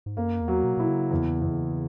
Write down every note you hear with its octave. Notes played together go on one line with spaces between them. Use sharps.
G#2
F#2 A#3
E2
F#3
B2
B2 E4
C#3
E2
E2